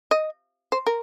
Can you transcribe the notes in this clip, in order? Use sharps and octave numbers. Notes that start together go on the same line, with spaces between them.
D#5
C5
A#4